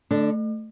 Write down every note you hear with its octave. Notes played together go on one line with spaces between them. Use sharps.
D3 A3 D4